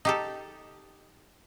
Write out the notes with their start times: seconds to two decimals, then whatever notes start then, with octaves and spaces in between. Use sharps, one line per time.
0.05 D#4 G4 A4